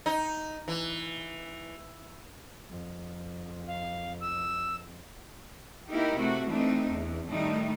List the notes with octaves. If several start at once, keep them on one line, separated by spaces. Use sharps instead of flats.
D#4
E3
F2
F5
E6
A#3 D#4 E4 G4 A#4
C3 A3 F#4
E3 A3 C4 D4 D#4
E2
A2 D#3 G3 A3 D4 D#4